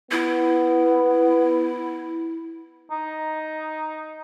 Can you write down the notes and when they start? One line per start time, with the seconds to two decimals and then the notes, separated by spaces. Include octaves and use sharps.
0.11 B3 E4
2.91 D#4